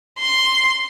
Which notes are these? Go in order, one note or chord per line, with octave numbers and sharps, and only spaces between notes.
C6